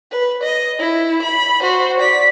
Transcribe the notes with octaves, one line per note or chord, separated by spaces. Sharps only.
B4
D#5
E4
B5
F#4 C5
D5 B6